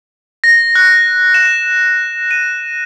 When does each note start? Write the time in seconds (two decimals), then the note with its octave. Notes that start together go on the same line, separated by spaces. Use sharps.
0.44 A#6
0.75 F#6
1.34 E7
2.31 D#7